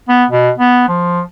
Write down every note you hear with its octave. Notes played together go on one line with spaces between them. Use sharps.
B3
B2
B3
F3